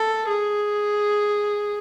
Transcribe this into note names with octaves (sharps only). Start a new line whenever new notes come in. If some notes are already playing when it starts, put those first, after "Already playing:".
Already playing: A4
G#4